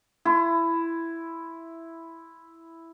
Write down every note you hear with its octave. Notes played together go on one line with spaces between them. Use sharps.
E4 C6